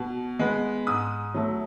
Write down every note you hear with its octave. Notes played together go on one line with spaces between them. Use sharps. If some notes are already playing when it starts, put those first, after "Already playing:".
Already playing: B2
G#3 B3
G#2 D#6
F#3 A3